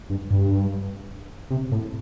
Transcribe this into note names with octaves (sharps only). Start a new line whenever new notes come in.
G2
G2
C3
A2